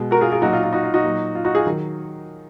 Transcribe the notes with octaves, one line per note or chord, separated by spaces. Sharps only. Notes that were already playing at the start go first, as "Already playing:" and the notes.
Already playing: B2 G#3
F#4 A#4
F4 G#4
F4 G#4
A#2 F#3 D#4 F#4
F4
F4
D#4 F#4
F4
D#4 F#4
A#2 F#3
F4
D#4 F#4
F4 G#4
D#3 F#3